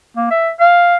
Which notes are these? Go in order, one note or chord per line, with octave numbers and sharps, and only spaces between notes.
A#3
E5
F5